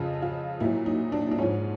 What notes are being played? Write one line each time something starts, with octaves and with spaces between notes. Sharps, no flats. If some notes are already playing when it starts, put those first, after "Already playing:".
Already playing: F2 C#3 F3 F4
F4
A#2 F#3 E4
D#4
D4
D4
G#2 F3 C#4